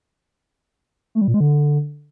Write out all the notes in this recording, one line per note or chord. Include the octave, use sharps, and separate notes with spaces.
A3
G3
A#2
G#3
D3